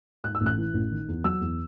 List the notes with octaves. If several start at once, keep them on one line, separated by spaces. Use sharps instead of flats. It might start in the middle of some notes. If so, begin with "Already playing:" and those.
G#2 F#6
E6
A1
F#6
E3
A1
D#3
E2
F#3 E6
E2